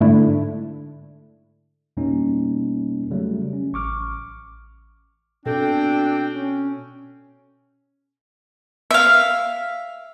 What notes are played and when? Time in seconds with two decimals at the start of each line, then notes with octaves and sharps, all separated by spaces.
0.01 G#2 D3 A3 D4 E4
1.97 F2 B2 G3 A#3 C#4 D#4
3.11 C#3 F#3 G3 A3
3.53 C#4
3.73 A1 C#6 D6 F6
5.46 B2 C4 D4 A4 G5
6.33 C#4
8.91 E5 F5